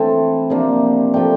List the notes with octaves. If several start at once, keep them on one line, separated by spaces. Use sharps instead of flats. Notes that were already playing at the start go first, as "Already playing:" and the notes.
Already playing: E3 A3 C4 D4 E4 A5
C3 F3 A#3 D4
F3 A3 D4 G5